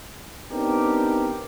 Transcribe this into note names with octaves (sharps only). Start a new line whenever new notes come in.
B3 C4 D4 D#4 G4 A#4